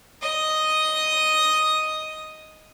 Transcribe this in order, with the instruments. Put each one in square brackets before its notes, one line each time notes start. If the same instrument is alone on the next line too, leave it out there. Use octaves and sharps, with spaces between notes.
[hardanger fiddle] D#5 D#6